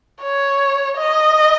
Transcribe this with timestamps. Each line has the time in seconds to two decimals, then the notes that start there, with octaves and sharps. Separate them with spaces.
0.23 C#5
0.97 D#5